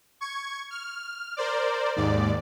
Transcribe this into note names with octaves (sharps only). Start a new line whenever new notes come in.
C#6 G#6
F6
A#4 C5 D5
D#2 G#2 D5